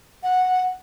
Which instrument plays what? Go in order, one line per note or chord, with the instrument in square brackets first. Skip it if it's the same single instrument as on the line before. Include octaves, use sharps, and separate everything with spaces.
[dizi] F#5